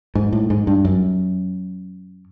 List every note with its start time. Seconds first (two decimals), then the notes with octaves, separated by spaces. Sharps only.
0.15 G#2
0.33 A2
0.50 G#2
0.67 G2
0.85 F#2